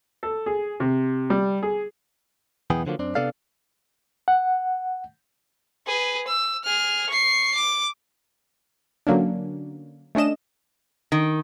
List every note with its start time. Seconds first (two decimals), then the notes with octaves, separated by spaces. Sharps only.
0.23 A4
0.46 G#4
0.80 C3
1.30 G3
1.63 G#4
2.70 B1 E2 E3 B3 G#4 G5
2.86 D3 F3 F#3 A#3
2.99 F#2 C4 D4
3.15 C3 B3 D4 A4 D5 F5
4.28 F#5
5.87 G#4 B4
6.28 E6
6.64 G#4 F6
7.10 C#6 C7
7.54 D6
9.07 D3 F#3 A#3 C#4 D4
10.15 A3 C#4 D4 D#5 E7
11.12 D#3